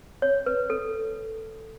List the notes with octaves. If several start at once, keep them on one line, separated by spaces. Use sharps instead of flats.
C#5
B4
A4